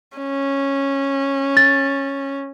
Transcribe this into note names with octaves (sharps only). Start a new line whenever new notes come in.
C#4
A6